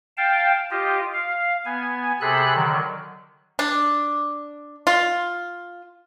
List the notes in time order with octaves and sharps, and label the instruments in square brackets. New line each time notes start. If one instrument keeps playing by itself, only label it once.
[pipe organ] F5 G5 A5
F4 G4 D#5
F5
B3 G#5
C3 G#4 A4 B5 F#6
D3 D#3 F#3
[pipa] D4
F4